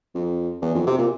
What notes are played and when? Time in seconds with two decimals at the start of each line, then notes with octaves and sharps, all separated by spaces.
0.15 F2
0.62 E2
0.75 F2
0.87 C3
0.98 A#2